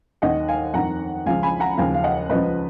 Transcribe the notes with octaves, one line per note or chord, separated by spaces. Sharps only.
D#2 D#3 D#5 F#5
F5 G#5
F2 D#3 F#5 A#5
C#2 C#3 F3 F5 G#5
G#5 B5
F#5 A#5
D#2 C#3 F3 F5 G#5
F5
D#5 F#5
C#2 C#3 F3 B4 D#5